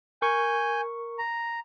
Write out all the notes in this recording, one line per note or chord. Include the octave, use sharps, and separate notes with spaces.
A#4 G#5 C#6 G6
A#5